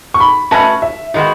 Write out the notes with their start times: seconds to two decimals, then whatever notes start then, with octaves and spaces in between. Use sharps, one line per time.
0.14 C#6
0.20 B5
0.51 A3 C#4 F#4 B4 D#5 A5
0.82 E5
1.14 D#3 G#3 B3 F#4 D#5